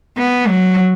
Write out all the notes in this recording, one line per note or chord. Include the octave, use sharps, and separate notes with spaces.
B3
F#3